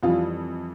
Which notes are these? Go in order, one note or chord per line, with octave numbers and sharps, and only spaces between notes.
F2 E3 G3 F4